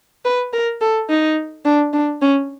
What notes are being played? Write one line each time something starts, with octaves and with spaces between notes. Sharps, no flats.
B4
A#4
A4
D#4
D4
D4
C#4